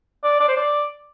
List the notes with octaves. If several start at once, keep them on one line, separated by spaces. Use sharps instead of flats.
D5
D5
C5
D5